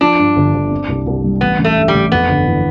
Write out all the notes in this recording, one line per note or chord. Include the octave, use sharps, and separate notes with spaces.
F3 D4
G2
G1
G1
C4
C2
C2
G3
A1 B3
A1
A3
G2
G3
A1
F2 B3
G1
E3